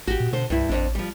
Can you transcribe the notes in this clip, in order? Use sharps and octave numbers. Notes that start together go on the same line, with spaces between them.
A1 F#4 G4
A#2
B2 D3 C5
C2 G2 E4
A1 F2 D4
F3 G3